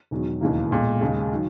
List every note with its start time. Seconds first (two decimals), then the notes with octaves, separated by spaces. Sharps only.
0.11 E1 E2 D#3 F#3
0.41 E1 D#2 C#3 E3 A#3
0.71 B1 A#2 G#3
1.01 D#2 C#3 G#3
1.33 D#3 F#3